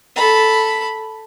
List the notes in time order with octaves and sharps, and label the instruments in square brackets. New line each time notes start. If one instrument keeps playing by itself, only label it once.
[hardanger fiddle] A4 B5